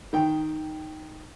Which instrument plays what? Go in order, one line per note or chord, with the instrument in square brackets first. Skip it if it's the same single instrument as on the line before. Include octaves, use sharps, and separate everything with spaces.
[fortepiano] D#3 G5